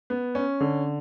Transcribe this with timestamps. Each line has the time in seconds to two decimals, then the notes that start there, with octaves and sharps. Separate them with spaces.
0.10 B3
0.35 C#4
0.61 D3